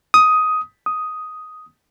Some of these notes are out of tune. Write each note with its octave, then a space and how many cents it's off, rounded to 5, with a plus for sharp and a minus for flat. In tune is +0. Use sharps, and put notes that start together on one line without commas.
D#6 +10
D#6 +5